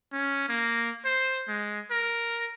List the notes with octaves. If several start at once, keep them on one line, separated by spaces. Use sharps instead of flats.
C#4
A#3
C5
G#3
A#4